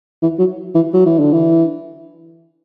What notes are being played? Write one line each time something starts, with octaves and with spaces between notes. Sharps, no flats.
E3
F#3
E3
F#3
E3
D3
E3